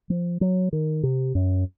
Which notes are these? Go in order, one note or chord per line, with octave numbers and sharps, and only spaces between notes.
F3
F#3
D#3
C3
F#2